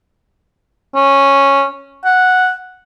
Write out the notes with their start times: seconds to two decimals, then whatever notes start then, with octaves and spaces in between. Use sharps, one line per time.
0.95 C#4
2.05 F#5